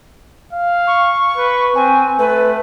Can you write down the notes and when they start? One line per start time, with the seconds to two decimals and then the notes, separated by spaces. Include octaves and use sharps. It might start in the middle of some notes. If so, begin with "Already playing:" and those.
0.53 F5
0.87 C#6
1.37 B4
1.75 C4 G#5
2.19 A3 B4